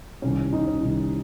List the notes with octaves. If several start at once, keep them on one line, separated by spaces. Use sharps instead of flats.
C2 C3 D#3 C#4
C2 C3 D#3 D#4
C#4
C2 C3 D#3 D#4